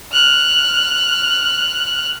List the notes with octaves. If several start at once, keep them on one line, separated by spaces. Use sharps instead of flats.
F6 F#6